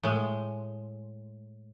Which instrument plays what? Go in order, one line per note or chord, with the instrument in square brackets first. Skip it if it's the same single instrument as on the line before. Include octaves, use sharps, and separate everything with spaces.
[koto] A2 G#3